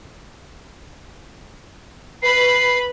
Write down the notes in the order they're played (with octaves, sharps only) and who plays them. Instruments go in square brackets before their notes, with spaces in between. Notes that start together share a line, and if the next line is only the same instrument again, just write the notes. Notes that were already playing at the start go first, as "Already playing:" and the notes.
[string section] B4 B5 [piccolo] C7